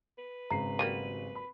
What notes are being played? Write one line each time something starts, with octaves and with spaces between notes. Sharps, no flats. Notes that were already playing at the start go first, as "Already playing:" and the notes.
B4
G#1 C#3 A#5 C7
F#3 G3 A#3 D#7
B5